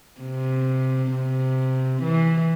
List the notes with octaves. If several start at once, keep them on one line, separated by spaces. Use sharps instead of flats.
C3
C3
E3